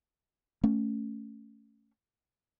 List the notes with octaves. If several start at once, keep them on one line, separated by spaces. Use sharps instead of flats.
A3 C#4